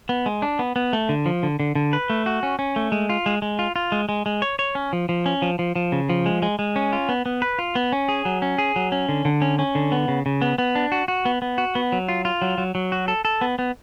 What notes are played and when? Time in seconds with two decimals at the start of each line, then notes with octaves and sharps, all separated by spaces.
0.09 B3
0.26 G#3
0.42 D4
0.59 B3
0.76 B3
0.93 A3
1.09 D3
1.26 F3
1.43 D3
1.60 D3
1.75 D3
1.93 B4
2.10 A3
2.26 F#4
2.43 C#4
2.59 C#4
2.76 A3
2.92 G#3
3.09 F4
3.26 G#3
3.42 G#3
3.59 F4
3.76 F4
3.92 G#3
4.09 G#3
4.26 G#3
4.42 C#5
4.59 C#5
4.75 C#4
4.93 F3
5.09 F3
5.26 C#4
5.42 F3
5.59 F3
5.76 F3
5.92 C#3
6.09 F3
6.26 G#3
6.42 G#3
6.59 G#3
6.76 C#4
6.93 F4
7.09 B3
7.26 B3
7.42 B4
7.59 F4
7.75 B3
7.92 C#4
8.09 G#4
8.25 F#3
8.42 C#4
8.58 G#4
8.76 F#3
8.92 C#4
9.09 D3
9.25 D3
9.42 C#4
9.59 C#4
9.75 D3
9.92 B3
10.08 C#3
10.26 C#3
10.42 B3
10.58 B3
10.75 D4
10.92 F#4
11.08 F#4
11.25 B3
11.42 B3
11.58 F#4
11.75 B3
11.92 F#3
12.08 F4
12.25 F4
12.42 F#3
12.58 F#3
12.75 F#3
12.92 F#4
13.08 A4
13.25 A4
13.41 B3
13.59 B3